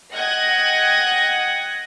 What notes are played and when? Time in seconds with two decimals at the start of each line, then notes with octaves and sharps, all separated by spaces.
0.13 D#5 F#5 G5 F#6 G#6 A#6